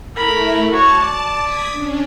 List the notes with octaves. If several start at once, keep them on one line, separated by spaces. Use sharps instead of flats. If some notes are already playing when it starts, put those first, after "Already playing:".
A3 E4 A#4 B5
F#4 C#5 A5
D5
D#6 G#6 B6
C#4 D4